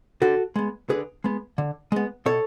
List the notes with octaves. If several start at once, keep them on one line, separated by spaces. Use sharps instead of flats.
D3 F#4 A4
G#3 B3
D3 G#4 B4
G#3 B3
D3
G#3 B3
B2 A4 C#5